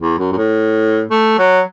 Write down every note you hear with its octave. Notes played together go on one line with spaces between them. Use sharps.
E2
F#2
F#2
A2
A3
F#3